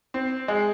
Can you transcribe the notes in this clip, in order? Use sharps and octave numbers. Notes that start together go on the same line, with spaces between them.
C4
G#3